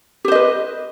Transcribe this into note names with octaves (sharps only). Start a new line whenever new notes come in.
G4 B4 C5 D#5